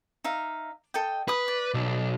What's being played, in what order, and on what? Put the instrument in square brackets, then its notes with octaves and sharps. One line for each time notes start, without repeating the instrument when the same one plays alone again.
[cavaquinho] D#4 E5 F5
A4 D#5 G5
[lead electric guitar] B4 [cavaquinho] B5 D#6
[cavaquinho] D5
[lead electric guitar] B1